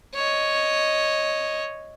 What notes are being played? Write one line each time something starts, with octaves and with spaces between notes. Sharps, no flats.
C#5 D#5